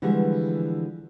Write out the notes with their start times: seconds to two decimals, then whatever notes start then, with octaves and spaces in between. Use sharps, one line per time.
0.02 D3 E3 F3 G3 G#3 F#4